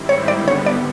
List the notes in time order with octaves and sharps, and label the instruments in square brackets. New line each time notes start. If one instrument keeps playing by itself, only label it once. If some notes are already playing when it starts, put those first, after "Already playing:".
Already playing: [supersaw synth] G#2 D#3 G3 C4 E4
[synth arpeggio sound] C#5
[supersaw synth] D3 G3 B3 [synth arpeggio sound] D5
[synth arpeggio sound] C#5
D5